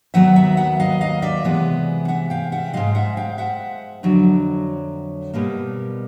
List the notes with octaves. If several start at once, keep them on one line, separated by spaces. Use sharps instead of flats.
D#2 D#3 F#3 B3 E5 F#5
E5 F#5
E5 F#5
D#5 F5
D#5 F5
D5 E5
C3 E3 G#3 B3
E5 F#5
F5 G5
E5 F#5
G#2 F3 G#3 D#5 F5
E5 F#5
F5 G5
E5 F#5
F2 D3 F#3
B2 G3 A#3